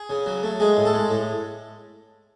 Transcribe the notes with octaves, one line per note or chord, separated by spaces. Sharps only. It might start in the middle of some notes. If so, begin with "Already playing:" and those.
Already playing: G#4
C#3
F#3
A3
G#3 G#4
A2
A4
G#3
A2